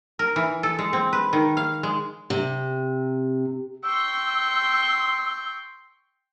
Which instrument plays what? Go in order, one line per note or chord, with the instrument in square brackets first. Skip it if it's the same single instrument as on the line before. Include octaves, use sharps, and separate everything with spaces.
[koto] A#4
E3
A4
G#3
C4
B4
D#3
F5
G#3
[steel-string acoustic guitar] C3
[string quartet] G5 C6 C#6 [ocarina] E6